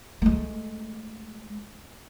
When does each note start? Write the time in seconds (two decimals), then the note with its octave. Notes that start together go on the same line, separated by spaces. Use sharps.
0.22 G#3 A3